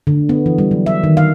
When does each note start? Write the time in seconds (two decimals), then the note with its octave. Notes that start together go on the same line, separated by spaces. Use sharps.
0.07 D3
0.29 B3
0.46 E3
0.58 G3
0.71 F#3
0.86 E5
1.03 D#3
1.17 F5